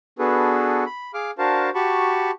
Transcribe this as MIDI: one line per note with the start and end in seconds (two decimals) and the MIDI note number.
0.19 0.84 59
0.19 0.84 62
0.19 0.84 66
0.19 0.84 68
0.19 0.84 69
0.19 0.84 71
0.86 1.12 83
1.14 1.31 68
1.14 1.31 77
1.14 1.31 86
1.14 1.31 89
1.38 1.70 62
1.38 1.70 66
1.38 1.70 70
1.38 1.70 72
1.38 1.70 77
1.38 1.70 81
1.75 2.31 66
1.75 2.31 67
1.75 2.31 81
1.75 2.31 83
1.75 2.31 85